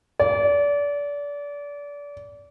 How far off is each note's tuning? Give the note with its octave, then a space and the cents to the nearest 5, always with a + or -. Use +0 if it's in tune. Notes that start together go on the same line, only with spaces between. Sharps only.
D5 -30